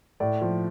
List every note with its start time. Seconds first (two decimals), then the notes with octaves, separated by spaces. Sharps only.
0.20 A2 D5
0.42 F3